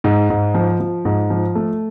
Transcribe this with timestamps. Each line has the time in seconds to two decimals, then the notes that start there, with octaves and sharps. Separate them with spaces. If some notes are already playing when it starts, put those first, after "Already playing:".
0.04 G#2
0.30 G#2
0.54 F3
0.80 F3
1.05 G#2
1.30 F3
1.55 A3